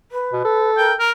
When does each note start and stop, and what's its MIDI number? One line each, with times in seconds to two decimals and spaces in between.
0.11 0.70 71
0.33 0.43 47
0.45 0.94 69
0.77 0.92 70
0.77 0.95 79
1.00 1.12 70
1.00 1.11 82